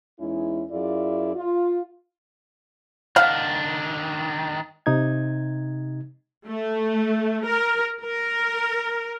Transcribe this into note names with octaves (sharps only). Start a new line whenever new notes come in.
E2 G#3 C#4 D#4 E4
F#2 E4 F4 G#4 D5
F4
D#3 D4 F5 F#5
C3 D#4 G#6
A3
A#4
A#4